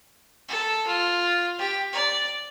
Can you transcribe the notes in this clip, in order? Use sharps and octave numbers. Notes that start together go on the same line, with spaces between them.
A4
F4
G4
D5